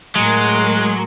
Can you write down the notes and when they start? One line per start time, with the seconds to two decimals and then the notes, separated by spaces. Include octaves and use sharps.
0.16 A2 F#3 G#3 G#4 A#4 G#5 C6